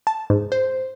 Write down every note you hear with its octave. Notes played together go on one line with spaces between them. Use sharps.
A5
G#2
C5